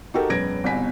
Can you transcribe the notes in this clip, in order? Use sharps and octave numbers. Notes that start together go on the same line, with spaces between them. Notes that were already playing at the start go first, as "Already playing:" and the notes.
D#4 F#4 G4 A4 A#4
E1 F#2 B4 G#6 A#6 D7
G1 C2 B2 G#5 B6